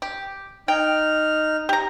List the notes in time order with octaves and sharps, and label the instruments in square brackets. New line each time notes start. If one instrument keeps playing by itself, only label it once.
[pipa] G4
[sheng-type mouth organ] D#4 F6 [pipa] G5
[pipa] G4 A#5